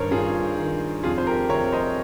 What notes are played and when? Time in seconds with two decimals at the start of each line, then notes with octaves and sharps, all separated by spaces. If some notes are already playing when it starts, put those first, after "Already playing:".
Already playing: G2 D#3 A#4 C5 C#5
0.11 G2 F4 G#4
0.57 D#3
1.03 F2 F4 G#4
1.18 C5
1.27 G4 A#4
1.49 C3 A#4 C#5
1.72 C5 D#5